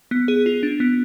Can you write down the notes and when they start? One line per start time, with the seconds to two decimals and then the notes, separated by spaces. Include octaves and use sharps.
0.11 B3
0.28 G#4
0.46 F4
0.63 D4
0.80 B3